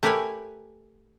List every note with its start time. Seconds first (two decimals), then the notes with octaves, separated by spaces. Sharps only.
0.03 A3 G4 A#4 B4 C#5 G#5